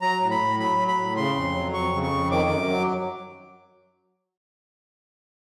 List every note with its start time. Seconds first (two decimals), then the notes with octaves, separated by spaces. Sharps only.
0.02 F#3 A#5
0.21 A2
0.31 B5
0.40 A2
0.59 F#3 B5
0.78 F#3
0.88 B5
0.97 A2
1.16 C#3 C6
1.36 F2
1.55 F#3
1.74 F2 C#6
1.93 C#3
2.03 C#6
2.12 F2
2.31 D#3 D6
2.50 F#2
2.69 F#3